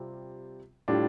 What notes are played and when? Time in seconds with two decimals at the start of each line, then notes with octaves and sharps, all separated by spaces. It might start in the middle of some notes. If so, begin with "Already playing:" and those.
Already playing: C3 G3 C4 F4
0.88 A2 G3 D4 F4